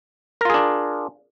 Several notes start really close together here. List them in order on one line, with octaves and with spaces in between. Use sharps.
A#4 F4 G#4 D4